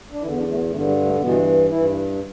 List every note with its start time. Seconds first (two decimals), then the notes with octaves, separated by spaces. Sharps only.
0.12 D4
0.22 E2 D3 E3 E4
0.31 B3
0.38 D3 D4
0.51 A3
0.55 B2 B3
0.72 G2 D3 A3
0.88 G3
1.05 A3
1.21 G2 B2 E3 B3
1.70 G2 E3 E4